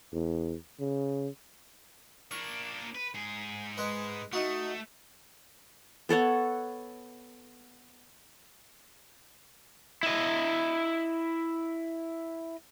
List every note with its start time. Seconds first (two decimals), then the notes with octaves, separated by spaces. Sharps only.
0.12 E2
0.80 C#3
2.31 A#3 D4 C#6
2.95 B4
3.14 G#2 G#4
3.78 G#3 B4
4.33 A3 D#4 F#4
6.09 B3 A4 C#5 F#5
10.03 E4 D#5